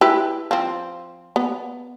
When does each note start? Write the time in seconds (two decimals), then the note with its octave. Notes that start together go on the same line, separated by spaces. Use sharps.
0.01 E4 G4 B4
0.51 F3 C4
1.36 B3